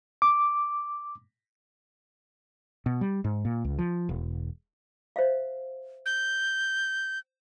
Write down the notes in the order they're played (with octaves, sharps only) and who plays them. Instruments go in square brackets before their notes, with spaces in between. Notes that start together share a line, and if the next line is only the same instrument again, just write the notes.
[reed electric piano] D6
[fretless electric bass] B2
G3
G#2
A#2
C#2
F3
E1
[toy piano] C5 E5 F5
[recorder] G6